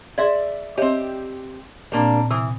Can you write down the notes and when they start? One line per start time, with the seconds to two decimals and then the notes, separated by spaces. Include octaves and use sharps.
0.18 G#4 D5 E5 C6 G#6
0.78 C4 G4 C#5 D#5 E5
1.92 A#2 G3 A#3 C4 D4
2.31 C3 E3 D#6